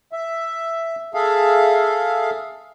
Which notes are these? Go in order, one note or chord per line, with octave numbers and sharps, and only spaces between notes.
E5
G#4 A4 E5 F5